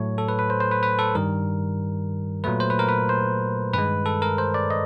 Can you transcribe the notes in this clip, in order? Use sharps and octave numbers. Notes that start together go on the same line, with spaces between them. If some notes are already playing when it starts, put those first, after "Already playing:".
Already playing: A2 F#3 A3 C#5
A4
B4
B4
C5
C5
B4
B4
A4
G2 D#3 G3 A#4
A#2 F#3 A3 B4
C5
B4
A#4
B4
C5
G2 D#3 G#3 B4
A4
A#4
C5
D5
D#5